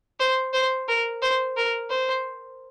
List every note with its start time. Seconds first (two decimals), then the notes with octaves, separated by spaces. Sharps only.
0.20 C5
0.53 C5
0.88 A#4
1.22 C5
1.57 A#4
1.90 C5